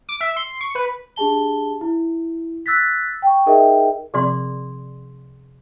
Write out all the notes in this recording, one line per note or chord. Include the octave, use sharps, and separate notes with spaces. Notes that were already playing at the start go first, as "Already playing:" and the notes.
D6
E5
C6
C#6
B4
D4 G4 G#4 A5 G7
E4
E6 F#6 A6 B6
G5 C#6
D#4 G#4 A#4 D#5 E5 G5
C3 F3 C4 G#4 D5 C6